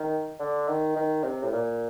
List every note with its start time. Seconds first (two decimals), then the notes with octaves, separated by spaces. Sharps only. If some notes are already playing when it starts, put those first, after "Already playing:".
Already playing: D#3
0.40 D3
0.68 D#3
0.96 D#3
1.24 C3
1.43 A2
1.52 A#2